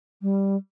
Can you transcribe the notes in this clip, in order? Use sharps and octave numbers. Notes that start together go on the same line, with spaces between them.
G3